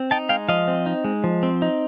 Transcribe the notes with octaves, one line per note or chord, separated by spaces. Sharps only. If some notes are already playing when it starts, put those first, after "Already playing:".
Already playing: C4
D#4 G5 A5
G#3 F5 G5
F3 D#5 F5
C4
D#4
G#3
F3
C4
D#4